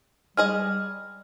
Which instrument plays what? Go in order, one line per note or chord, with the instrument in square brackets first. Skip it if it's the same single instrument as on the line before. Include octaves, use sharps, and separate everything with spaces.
[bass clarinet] G3 [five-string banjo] G#3 G#4 D#5 [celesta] F6